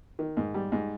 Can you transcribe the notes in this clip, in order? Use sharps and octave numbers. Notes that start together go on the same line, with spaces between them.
D#3
G#2
G3
G#2